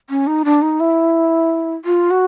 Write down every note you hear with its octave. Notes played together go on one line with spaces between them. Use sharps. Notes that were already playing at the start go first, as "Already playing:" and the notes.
C#4
D#4
D4
D#4
E4
F4
F#4